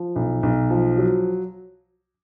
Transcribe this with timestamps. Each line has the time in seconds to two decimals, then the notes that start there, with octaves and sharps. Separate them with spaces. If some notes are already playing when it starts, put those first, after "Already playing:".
Already playing: F3
0.16 B1
0.43 B1
0.70 F3
0.98 F#3